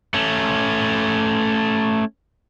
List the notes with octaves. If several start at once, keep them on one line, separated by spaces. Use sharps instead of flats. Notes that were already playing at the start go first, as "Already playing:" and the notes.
A3 C#4